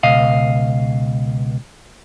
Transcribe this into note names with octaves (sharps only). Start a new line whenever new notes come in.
C#2 B2 D#5 F5